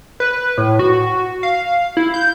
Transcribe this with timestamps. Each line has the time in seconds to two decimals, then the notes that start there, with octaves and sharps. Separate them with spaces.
0.20 B4
0.58 A2
0.79 F#4
1.43 F5
1.97 E4
2.14 G6